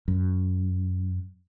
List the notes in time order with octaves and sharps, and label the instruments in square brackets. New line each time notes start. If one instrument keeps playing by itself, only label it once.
[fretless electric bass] F#2